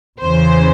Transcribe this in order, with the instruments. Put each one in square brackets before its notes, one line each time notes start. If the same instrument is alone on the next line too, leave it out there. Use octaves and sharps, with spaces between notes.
[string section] E2 C#3 E3 C5